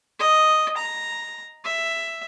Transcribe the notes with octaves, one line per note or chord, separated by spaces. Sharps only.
D#5
A#5
E5